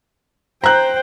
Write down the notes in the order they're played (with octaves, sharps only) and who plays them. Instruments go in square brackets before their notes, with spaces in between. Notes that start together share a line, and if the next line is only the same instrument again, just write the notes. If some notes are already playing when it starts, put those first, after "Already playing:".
[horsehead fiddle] C5 G5 [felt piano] A#5 F#6